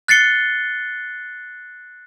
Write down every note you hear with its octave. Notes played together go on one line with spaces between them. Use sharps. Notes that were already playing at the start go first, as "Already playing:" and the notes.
F#6 A6 C7 C#7 G7